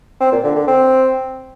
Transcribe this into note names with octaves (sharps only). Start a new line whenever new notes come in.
C4
A#2
D3
D3
C4